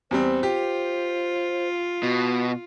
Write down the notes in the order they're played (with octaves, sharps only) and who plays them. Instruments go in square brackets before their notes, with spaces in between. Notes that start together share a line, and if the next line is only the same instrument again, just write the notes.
[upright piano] E2 G3 C4 [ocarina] C5
[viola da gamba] F4 [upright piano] G4
[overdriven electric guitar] B2 [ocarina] F#4